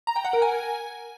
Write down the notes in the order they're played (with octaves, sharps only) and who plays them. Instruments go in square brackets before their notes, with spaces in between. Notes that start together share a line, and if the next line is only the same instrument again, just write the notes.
[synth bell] A#5
G5
F#5
A#4
G#5